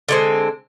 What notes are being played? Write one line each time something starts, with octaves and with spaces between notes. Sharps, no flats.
D3 G#3 C4